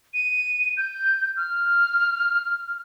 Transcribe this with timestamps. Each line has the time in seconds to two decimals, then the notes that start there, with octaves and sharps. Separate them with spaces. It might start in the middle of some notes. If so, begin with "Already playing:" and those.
0.14 D#7
0.77 G6
1.37 F6